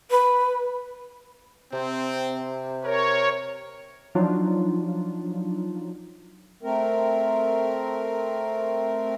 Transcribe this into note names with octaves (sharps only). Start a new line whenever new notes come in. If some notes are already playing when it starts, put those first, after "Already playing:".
B4
C3 C4
A#4 C#5
F3 F#3 D4 D#4 F4
A3 C4 A#4